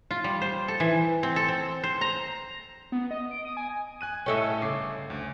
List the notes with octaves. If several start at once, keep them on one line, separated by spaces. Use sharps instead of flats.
F4
G3
C5
A4
E3
C4
A4
C4
C5
A#5
B3
D#5
D7
D#6
G#5
G#5 F#6 D#7
A2 C#4 A4 D#5 E5 G5
G1 C#3 D6 C7
D2